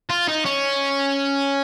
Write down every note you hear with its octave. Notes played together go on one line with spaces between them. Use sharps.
F4
D#4
C#4